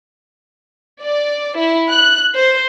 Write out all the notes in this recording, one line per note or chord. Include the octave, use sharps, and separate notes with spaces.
D5
E4
F#6
C5